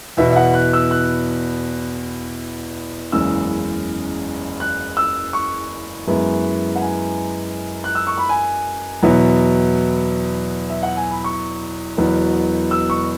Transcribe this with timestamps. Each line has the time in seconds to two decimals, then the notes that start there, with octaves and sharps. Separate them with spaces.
0.17 E2 B2 B3 E4 E5
0.31 E5
0.36 F#5
0.54 F#6
0.73 E6
0.91 F#6
3.12 F#1 E2 C#3 G#3 E6
4.60 F#6
4.97 E6
5.33 C#6
6.07 F#2 E3 G#3 B3 E4
6.75 F#5
6.81 G#5
7.84 F#6
7.95 E6
8.07 C#6
8.18 B5
8.29 G#5
9.03 E2 B2 F#3 B3 E4
10.70 E5
10.83 F#5
10.96 G#5
11.10 B5
11.24 C#6
11.97 E1 E2 B2 F#3 B3
12.71 E6
12.90 C#6